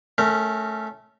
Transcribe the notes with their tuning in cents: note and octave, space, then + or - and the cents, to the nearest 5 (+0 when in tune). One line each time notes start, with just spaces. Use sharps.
A3 -15 C#4 +0 A#4 -30